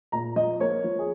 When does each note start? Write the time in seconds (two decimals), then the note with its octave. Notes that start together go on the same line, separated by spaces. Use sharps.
0.12 A#2 A#5
0.36 F3 D#5
0.60 A#3 C#5
0.84 F3
0.99 G#4